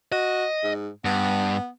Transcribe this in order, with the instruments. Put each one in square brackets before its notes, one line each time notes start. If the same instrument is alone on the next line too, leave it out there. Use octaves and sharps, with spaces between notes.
[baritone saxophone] F#4 [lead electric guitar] D#5
[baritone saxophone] G#2
[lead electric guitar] G2 [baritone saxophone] B3